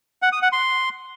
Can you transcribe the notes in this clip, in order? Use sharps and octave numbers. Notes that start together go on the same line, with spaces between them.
F#5
D#6
F#5
C6